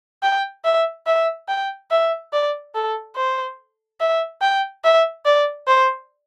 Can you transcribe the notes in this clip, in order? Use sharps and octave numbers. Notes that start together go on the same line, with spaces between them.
G5
E5
E5
G5
E5
D5
A4
C5
E5
G5
E5
D5
C5